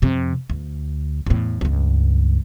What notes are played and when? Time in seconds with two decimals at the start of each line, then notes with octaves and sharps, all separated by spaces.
0.02 F2 C3
0.50 D2
1.26 E2 A2
1.61 C#2 G2